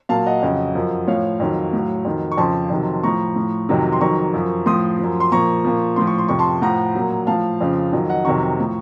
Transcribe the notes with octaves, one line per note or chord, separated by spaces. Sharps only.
A#2 F#3 F5 A5
D#5 F#5
F2 C#3 F#3
F#2 F3
A2 F3 C#5 F5
F2 D#3 F#3
A2 F#3
F2 D#3 F#3
C#6
F2 C#3 F3 A5 C6
F2 C3 D#3 F#3
A2 F3 A#5 C#6
A2 F3
F2 C3 D#3 F#3
C6
F2 D#3 F#3 A#5 C#6
F#2 F3
A2 F3 C6 D#6
F#2 F3
C6
A#2 F3 A#5 C#6
A#2 F3
A2 F3 C6
C#6
C6
F2 C3 F3 C#6
A5 C6
A2 F3 F#5 A#5
A#2 F#3
A2 F3 F5 A5
F2 C#3 F3
F2 D#3 F#3
D#5 F#5
F2 C3 D#3 F#3 A#5 C#6
A2 F3